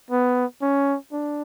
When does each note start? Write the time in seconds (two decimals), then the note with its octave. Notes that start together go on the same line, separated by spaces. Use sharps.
0.10 B3
0.62 C#4
1.12 D4